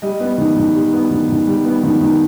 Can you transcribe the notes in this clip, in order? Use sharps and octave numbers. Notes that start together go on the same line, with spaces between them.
G3 D#5
B3
D#3
D#3
G3
B3
D#3
D#3
G3
B3
D#3
D#3